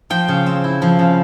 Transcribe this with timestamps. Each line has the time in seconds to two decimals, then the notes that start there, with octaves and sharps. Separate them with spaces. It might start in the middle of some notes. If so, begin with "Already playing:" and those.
0.10 F3 G5
0.28 C#3
0.46 C4
0.64 E4
0.82 F3
0.99 C#3